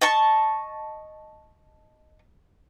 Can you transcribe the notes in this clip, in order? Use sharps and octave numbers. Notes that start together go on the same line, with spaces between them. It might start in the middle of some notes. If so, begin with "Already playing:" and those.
D#5 A5 C#6